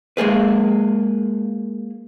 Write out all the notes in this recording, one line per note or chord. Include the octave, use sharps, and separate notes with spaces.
G#3 A#3 G#4 B4